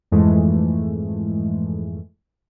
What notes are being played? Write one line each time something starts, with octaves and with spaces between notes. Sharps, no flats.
F2 G#2 E3 G#3 A3